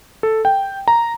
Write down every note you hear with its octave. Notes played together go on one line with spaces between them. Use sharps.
A4
G5
A#5